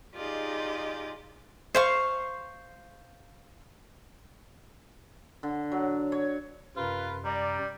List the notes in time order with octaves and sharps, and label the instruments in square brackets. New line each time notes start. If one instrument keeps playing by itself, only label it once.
[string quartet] D#4 F4 G4 G#4 D5 D#5
[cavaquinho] C5 F5 C#6
[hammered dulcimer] D3
F#3
C#5
[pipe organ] F#2 C3 [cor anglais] F4 [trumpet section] A#4 B4
[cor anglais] G3 [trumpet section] D5 [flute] A#5